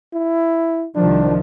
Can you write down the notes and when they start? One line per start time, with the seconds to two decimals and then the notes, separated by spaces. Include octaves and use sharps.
0.14 E4
0.95 C2 D#3 F3 D4